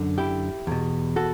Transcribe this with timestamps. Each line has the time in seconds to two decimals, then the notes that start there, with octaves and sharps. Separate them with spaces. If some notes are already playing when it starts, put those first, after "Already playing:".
Already playing: F#2 D3
0.18 E4 G4
0.67 E2 B2
1.16 F#4 A4